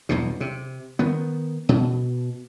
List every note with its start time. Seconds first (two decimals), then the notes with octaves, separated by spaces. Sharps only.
0.09 B1 E2 G2 B2
0.40 C3
0.99 D#3 B3
1.69 B2